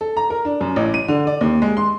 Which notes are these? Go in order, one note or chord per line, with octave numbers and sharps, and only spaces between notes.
A4
A#5
A#4
D4
F#2
A1
D#7
D3
D5
D#2
G#3
C6